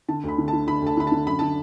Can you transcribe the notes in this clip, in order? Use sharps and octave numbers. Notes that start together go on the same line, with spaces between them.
D3 A5
D2 B5
D3
A5
D3
D3 B5
D2 A5
D3 B5
A5
D3
F#2 B5
D3 A5